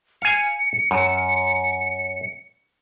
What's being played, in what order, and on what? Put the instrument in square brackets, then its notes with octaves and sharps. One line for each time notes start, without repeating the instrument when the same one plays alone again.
[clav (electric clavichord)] F5 G#5 [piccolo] C#7
[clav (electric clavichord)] F#2